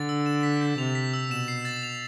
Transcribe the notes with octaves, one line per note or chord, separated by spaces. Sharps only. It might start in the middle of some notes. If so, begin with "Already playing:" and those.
Already playing: D3 A6
E6
E7
B6
G6
C3 F7
B6
E6
B2 E7
C7
A6
F7